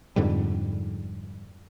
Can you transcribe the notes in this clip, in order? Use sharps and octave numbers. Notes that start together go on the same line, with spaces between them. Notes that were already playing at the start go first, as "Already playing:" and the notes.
F2 G#2 D3 G3